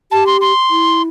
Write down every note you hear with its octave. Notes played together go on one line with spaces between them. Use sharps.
G4 A5
C6
C6
E4